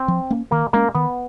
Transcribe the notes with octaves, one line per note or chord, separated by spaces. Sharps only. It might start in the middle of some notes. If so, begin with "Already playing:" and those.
Already playing: C4
F3
A#3 C#4
D#3 A#3
G#3 A#3 C#4
D#3 B3